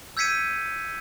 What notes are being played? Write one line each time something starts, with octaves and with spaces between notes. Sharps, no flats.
E6 G6 G#6 B6 C#7 D#7